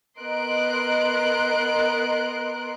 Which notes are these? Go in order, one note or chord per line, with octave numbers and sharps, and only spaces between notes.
B3 A#4 D#5 C6 F#6 D7